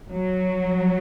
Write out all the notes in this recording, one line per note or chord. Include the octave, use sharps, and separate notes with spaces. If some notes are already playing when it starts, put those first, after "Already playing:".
F#3